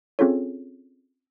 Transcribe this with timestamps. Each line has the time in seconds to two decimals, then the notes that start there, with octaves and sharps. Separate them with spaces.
0.19 C4 C#4 F4 G#4 A4 C#5